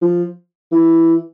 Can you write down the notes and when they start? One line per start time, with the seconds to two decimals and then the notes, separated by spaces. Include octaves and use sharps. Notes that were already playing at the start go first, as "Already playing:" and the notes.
0.02 F3
0.72 E3